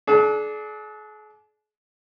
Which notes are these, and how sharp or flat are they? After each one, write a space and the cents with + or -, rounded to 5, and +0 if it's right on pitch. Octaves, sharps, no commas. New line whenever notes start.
D4 +0 G#4 +45